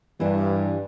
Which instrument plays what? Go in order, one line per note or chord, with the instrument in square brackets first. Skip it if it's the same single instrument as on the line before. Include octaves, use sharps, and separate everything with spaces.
[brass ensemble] G2 [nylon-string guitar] E3 D4